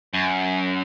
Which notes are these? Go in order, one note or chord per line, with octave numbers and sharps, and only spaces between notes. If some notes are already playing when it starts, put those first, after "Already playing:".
F#2